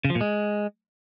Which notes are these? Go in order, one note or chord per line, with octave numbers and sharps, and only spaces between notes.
C#3
F3
A#2
G#3